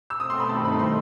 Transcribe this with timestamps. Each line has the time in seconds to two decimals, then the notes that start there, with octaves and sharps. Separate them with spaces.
0.10 E6
0.19 B2 A3 C4 D#6
0.30 C6
0.40 B5
0.49 G2 D#3 A3 D#4 A5
0.65 B5
0.79 C6